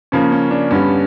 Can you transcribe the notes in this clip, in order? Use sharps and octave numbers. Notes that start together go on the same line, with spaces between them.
C#3 F3 A#3 C#4
C#4
D4
G2 D3 G3 B3 C#4